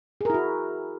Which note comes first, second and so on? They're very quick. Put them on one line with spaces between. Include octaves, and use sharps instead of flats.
G#4 A#4 E4 F#4